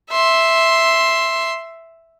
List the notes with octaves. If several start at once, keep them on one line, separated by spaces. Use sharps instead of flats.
E5 C6